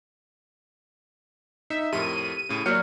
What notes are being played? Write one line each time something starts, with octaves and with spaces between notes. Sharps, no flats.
D#4 E5
F2 A2 G4 A#4 D#7
A2 C#3
F#3 A#3 D5 F6 G6 C#7